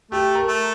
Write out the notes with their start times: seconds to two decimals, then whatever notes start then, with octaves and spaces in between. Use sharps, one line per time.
0.11 A3 G4
0.35 A#4
0.47 A3